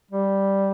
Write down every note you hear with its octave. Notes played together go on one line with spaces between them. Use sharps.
G3